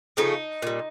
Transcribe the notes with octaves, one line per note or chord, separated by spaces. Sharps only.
C#3 F3 A3 D#4
A#2 G3